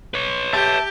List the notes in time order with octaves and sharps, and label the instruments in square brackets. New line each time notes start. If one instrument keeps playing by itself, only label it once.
[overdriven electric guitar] B4 C#5
[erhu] G4 [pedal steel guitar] E5 A5